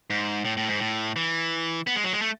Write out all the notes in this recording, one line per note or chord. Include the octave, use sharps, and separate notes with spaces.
G#2
A2
A2
G#2
A2
E3
B3
G#3
F#3
G#3
A3